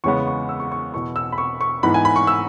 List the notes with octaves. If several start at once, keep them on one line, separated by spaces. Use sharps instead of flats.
E2 C#3 G#3 B3 C#6
C#6
E6
C#6
C#6
E2 B2 B3 C#6
E6
B5
C#6
C#6
G#2 E3 B3 B5
G#5
B5
C#6
E6